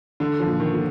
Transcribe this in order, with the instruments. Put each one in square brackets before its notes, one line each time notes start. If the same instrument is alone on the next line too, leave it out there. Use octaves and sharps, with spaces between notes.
[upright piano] D3 [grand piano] A3
[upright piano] F3
[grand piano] A#2
[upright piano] D#3
[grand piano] A#2